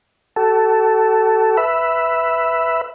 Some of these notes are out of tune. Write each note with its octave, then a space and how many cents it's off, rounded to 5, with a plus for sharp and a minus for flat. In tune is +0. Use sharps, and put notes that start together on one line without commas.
F#4 +40 A4 +0
B4 +0 E5 +0